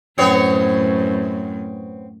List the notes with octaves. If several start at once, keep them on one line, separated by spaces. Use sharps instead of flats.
F#2 A2 B3 C4 C#5